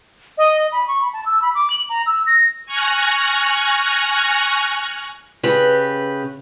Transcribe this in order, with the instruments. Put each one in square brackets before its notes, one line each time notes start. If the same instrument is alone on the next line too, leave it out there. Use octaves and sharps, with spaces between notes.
[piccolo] D#5
B5
C#6
B5
A5
E6
B5
D6
F#7
A#5
E6
A#6
[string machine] G#5 C#6 F6 F#6 A#6
[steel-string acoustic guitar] C#3 G4 B4